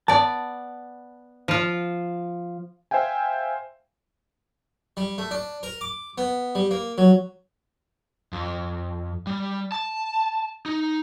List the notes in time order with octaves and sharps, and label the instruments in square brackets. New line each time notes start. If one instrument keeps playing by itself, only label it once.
[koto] B3 D5 [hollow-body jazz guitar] A5
[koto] F3 F4
[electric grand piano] C5 E5 F5 G5 G#5
[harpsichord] G3
A3
D4
A#4
D6
B3
G3
A#3
F#3
[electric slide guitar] F2
G3
A5
D#4